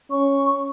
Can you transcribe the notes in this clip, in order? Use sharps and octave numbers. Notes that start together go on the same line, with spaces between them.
C#4 C#6